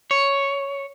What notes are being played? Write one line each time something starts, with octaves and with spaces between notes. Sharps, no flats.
C#5